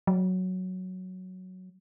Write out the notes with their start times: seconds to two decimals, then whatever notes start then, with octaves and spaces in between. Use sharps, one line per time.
0.07 F#3